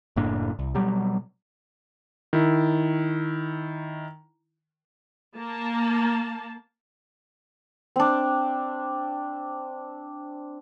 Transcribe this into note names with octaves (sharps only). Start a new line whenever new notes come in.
F#1 A2 A#3 D4
C2
B2 F#3 G3
D#3 E4
A#3 A5
C4 D4